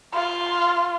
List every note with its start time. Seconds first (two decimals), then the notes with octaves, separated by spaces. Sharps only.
0.14 F4